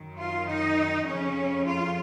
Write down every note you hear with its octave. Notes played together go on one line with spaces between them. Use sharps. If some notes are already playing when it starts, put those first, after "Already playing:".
Already playing: F#2 D#3
F4
D#4
F2 C#3 C#4
F4